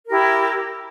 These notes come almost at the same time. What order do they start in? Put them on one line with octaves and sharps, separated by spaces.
A#4 G4 E4